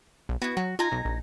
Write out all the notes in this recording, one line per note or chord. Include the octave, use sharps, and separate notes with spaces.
B1
B3 E4 F#4
F#3 F#4
D#4 F4 G#5 A#5
B1
A#1